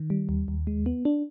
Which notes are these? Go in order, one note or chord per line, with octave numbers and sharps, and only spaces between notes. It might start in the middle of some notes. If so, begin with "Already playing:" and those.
Already playing: D#3
G3
D#2
D#2
G#3
B3
D4